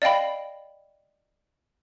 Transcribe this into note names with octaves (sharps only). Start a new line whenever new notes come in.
D5 D#5 F5 G5 B5